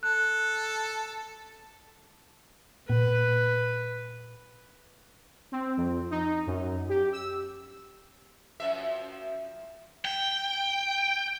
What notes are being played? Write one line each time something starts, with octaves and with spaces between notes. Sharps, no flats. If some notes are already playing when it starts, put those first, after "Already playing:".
A4 F#6
A#2 B4
C4
F2
D#4
F#2
G4
E6
F#2 F3 E5
G5